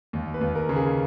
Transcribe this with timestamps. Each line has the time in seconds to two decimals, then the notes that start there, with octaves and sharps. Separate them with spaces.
0.13 D#2
0.34 B4
0.41 D#2
0.55 A#4
0.69 C#3
0.76 G#4